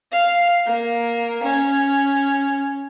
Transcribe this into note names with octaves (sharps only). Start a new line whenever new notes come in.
F5
A#3
C#4